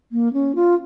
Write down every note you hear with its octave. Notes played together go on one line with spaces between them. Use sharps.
A#3
C#4
F4